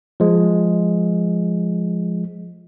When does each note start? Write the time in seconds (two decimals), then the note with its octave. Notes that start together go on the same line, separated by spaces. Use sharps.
0.20 F3 G#3